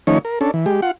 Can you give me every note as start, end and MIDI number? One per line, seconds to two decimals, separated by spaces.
0.07 0.18 51
0.07 0.18 53
0.07 0.18 57
0.07 0.18 61
0.07 0.18 63
0.07 0.18 73
0.25 0.39 70
0.41 0.51 61
0.41 0.51 62
0.41 0.51 69
0.54 0.66 52
0.66 0.81 56
0.66 0.81 67
0.82 0.91 65
0.82 0.91 78